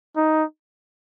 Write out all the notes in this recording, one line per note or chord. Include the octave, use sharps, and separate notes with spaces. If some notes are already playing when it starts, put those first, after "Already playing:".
D#4